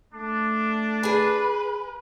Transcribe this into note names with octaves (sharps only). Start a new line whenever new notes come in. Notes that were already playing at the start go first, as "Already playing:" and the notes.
A3 D4
G#4 B4 G#5